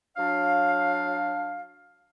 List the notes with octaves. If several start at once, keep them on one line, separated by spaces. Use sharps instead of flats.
F#3 D4 F5